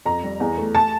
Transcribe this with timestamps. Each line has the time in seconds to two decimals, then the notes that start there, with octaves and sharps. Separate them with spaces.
0.06 F2 A#5
0.23 G3
0.40 E2
0.58 A3
0.75 A5